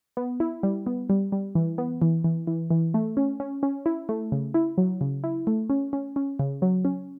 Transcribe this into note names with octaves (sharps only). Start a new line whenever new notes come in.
B3
E4
G3
B3
G3
G3
E3
B3
E3
E3
E3
E3
A3
C#4
C#4
C#4
E4
A3
C#3
E4
F#3
C#3
E4
A3
C#4
C#4
C#4
C#3
F#3
C#4